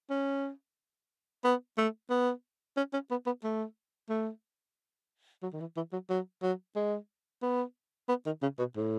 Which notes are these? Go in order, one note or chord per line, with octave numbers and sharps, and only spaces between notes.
C#4
B3
A3
B3
C#4
C#4
B3
B3
A3
A3
F#3
D#3
E3
E3
F#3
F#3
F#3
G#3
B3
B3
D#3
C#3
B2
A2